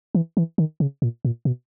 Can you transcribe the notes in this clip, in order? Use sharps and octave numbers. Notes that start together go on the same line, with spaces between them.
E3
E3
D#3
C#3
A#2
A#2
B2